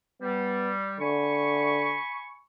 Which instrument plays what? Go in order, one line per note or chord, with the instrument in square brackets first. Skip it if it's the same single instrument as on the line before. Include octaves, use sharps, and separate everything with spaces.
[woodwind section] G3 [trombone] B3
[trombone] D3 [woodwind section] G#5 B5 C#6